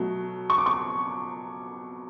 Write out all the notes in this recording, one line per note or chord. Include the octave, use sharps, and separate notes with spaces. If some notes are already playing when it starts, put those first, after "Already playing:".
Already playing: B2 F#3 A3
C#6
D6
C#6